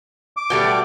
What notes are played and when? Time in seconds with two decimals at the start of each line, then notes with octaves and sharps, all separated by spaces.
0.37 D6
0.50 B2 G3 A3